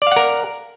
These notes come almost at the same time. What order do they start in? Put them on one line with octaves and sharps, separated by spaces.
D5 F5 F#5 A#4